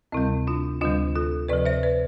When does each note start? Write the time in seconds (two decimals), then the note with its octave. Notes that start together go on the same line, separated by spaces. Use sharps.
0.12 D2 C3 G3 C4 E4
0.47 D4 F4
0.81 D2 D3 G3 D4 F4
1.15 F4 A4
1.49 D2 C3 F3 B4 D5
1.66 C5 E5
1.83 B4 D5